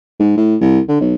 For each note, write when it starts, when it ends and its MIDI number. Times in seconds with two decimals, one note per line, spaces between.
0.19 0.32 44
0.37 0.55 45
0.60 0.79 36
0.88 0.97 50
1.01 1.15 35